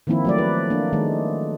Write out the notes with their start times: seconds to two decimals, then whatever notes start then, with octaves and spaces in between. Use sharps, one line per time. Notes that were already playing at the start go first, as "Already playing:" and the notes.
0.07 D#3 F3 A#3 C4 E4
0.25 F#3 A3 D5
0.38 E4 B4
0.70 A#3 D4
0.93 D#3 G#3 A3